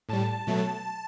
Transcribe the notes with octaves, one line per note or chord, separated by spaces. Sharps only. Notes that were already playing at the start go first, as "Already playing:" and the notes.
A2 G3 A5
B2 F#3 A3